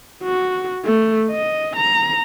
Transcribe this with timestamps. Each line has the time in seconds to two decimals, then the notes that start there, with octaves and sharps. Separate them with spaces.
0.23 F#4
0.85 A3
1.30 D#5
1.76 A#5